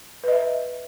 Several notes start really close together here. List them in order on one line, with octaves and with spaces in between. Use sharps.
B4 D#5 E5